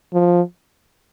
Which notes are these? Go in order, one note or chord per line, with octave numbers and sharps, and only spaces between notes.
F3